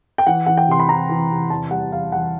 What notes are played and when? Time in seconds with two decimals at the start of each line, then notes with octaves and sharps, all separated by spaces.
0.18 G5
0.27 E3 F#5
0.46 E3 F#5
0.57 G5
0.69 C3 C6
0.80 B5
0.89 E3 A#5
1.09 E3
1.31 C3
1.50 E2 A5
1.71 G3 F#5
1.91 E2 F5
2.12 E2 F#5